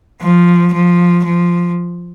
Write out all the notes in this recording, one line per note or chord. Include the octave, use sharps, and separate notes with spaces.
F3
F3
F3